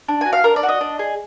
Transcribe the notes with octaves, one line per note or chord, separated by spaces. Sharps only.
D4
F#4 G#5
F5
D4 A#4
D5
F#4
D#5
D4
G#4